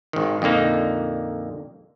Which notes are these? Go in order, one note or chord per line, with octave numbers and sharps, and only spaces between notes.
G#1 D#3
F2 A#2 D3 A#3 D#4